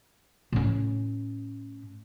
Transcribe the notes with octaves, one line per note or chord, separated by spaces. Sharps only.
A2 C#4